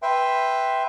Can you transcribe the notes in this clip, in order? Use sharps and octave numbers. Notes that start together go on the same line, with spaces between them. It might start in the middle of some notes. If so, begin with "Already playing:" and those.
B4 E5 G5 C6